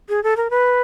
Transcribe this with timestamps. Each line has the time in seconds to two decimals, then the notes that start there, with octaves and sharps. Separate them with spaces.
0.09 G#4
0.23 A4
0.37 A#4
0.50 B4